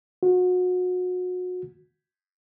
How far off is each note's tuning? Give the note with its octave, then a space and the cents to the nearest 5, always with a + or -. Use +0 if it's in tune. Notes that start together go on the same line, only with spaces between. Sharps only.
F#4 -30